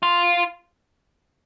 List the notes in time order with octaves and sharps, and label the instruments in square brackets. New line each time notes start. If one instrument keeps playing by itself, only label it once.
[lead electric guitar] F4